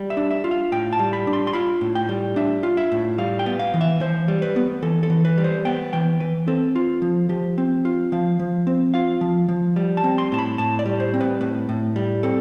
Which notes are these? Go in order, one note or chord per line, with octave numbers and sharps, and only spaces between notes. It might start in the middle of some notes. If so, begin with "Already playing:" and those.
Already playing: G3
E5
D4
E5
F4
F5
A2 G5
A5
G3
B5
D4
C6
C6
F4 B5
A2
G5
G3
D4 E5
F4
E5
A2
G3 F5
G5
B3
F5
E3
E5
E3 C5
G3
B4
B3
E3 A4
A4
E3
B4
G3
C5
B3 G5
E3 G5
E3 B4
C4 A4
F4
F3
F3 G4
C4
F4
F3 F5
F3
C4
F4 F5
F3
F3
G3
A5
C4
C6
A2 A5
B5
A2 A5
D5
G3
C5
C4
B4
A2 B4
A2
G3
C4 A4